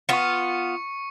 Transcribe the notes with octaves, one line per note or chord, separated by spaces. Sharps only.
B3 F4 C#6 C#7